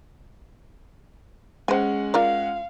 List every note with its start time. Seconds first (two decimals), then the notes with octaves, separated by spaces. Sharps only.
1.68 G#3 C#4 C5 F#5 G#5
2.14 F4 A#4 D5 F5